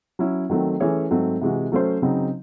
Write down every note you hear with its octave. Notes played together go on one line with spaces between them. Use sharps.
F#3 C#4 E4
D#3 F#3 A3 C4
E3 A3 C#4 G#4 C#5
G#2 F#3 A3 C4
C3 E3 G#3 C4 F#4
F#3 A3 C#4 F#4 C5
C#3 F#3 C4 D#4